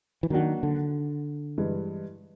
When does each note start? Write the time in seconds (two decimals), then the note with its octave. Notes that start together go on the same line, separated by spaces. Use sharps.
0.23 E3
0.30 D#3 F#3 A#3 D4 F#4
0.63 D3
1.58 G2 E3 G#3